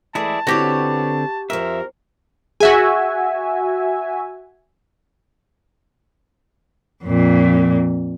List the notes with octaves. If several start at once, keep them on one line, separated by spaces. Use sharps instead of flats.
E3 G#3 A3 E4 G#4 D5 A5
D3 B3 C4 E4 F#4 G4 C#5
F2 F3 A#4 E5
F#4 G#4 E5 G#5
F2 A#2